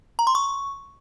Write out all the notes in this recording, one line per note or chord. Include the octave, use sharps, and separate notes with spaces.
A#5
C6
C#6